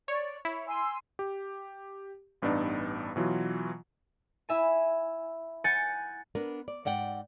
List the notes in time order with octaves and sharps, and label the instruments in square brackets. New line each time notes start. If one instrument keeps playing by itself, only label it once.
[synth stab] C#5 [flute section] D5
[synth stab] E4 [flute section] C#5
[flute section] G#5 C6 E6
[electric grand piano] G4
A1 G2 B3 D4 D#4
B2 E3 F#3 F4
[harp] E4 E5 G#5
F#5 G#5 G6 A6 C#7
[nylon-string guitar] B3 D4 A#4 B4
D5
G#2 D5 F#5 G5